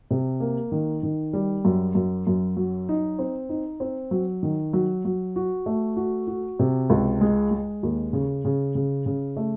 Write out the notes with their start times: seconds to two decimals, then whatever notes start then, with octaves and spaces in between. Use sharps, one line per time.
0.11 C3
0.40 A#3
0.72 D#3
1.03 D#3
1.33 G3
1.65 F#2
1.95 F#2
2.27 F#2
2.57 F#3
2.89 D#4
3.19 C4
3.49 D#4
3.80 C4
4.11 F#3
4.43 D#3
4.73 F#3
5.05 F#3
5.36 F#4
5.66 A3
5.96 F#4
6.27 F#4
6.59 C3
6.90 C#2
7.21 G#3
7.51 G#3
7.83 D#2
8.13 C#3
8.45 C#3
8.75 C#3
9.06 C#3
9.37 A3